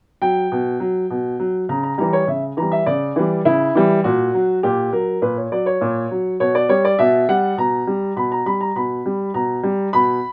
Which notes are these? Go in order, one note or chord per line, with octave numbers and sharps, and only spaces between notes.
F#3 G5
B2
F#3
B2
F#3
C#3 A#5
A#5
E3 G3 A#5
C#5
C#3 E5
E3 G3 A#5
E5
C#3 D5
E3 G3
C#3 E4
E3 G3
A#2 F#4
F#3
A#2 G4
F#3 A#4
A#2 B4
C#5
F#3 D5
C#5
A#2
F#3
B2 C#5
D5
G3 C#5
D5
B2 E5
G3 F#5
B2 A#5
G3
B2 B5
A#5
G3 B5
A#5
B2 B5
G3
B2 A#5
G3
B2 B5